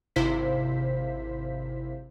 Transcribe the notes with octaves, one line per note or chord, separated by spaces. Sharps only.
G#1 C3 E4 C5 F5 B6